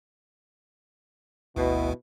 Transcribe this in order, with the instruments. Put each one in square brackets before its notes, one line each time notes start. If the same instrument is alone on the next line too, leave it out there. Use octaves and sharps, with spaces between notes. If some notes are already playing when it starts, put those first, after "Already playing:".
[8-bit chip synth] G#1 D2 [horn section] B2 [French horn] E4